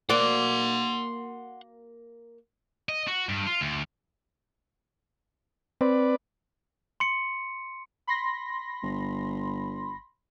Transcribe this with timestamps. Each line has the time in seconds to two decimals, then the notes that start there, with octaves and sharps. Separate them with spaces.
0.10 A#3 F#4 D5 F#5 C6
2.89 D#5
3.07 F#4
3.29 G2
3.47 F4
3.61 D2
5.81 C4 B4 D5
7.00 C6 C#7
8.07 B5 C6 A#6
8.83 G1